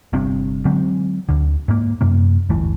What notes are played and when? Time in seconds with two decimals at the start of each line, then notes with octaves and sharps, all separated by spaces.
0.13 G1 G2 C3 C4
0.65 D3 F#3 G#3 C4
1.29 D2 D3
1.68 G#2 A#3
2.01 F#2 C3 A#3
2.49 D1 G1 E3 A3